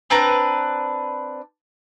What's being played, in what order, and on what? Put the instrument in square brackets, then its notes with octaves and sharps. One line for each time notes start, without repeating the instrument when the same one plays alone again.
[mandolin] C4 D4 B4 A#5